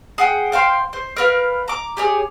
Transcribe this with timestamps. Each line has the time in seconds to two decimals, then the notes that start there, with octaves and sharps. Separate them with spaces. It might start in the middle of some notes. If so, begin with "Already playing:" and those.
0.18 G#4 F#5 G5
0.52 C5 F5 G5 C6
0.93 C5
1.17 A#4 B4 F5
1.68 A#5 D6
1.97 G4 G#4 C#5 D#6